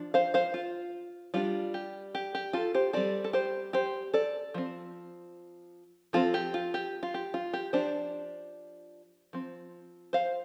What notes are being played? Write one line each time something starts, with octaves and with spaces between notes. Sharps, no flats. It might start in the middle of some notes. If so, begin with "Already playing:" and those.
Already playing: F3 D4
C5 F5
C5 F5
F4
G3 D4 F4
G4
G4
G4
F4 A4
G4 C5
G3 C4 A4 D5
A4
G4 C5
G4 C5
A4 D5
F3 C4
F3 C4 F4 A4
G4
F4
G4
F4
G4
F4
G4
F3 D4 G4 C5
F3 C4
C5 F5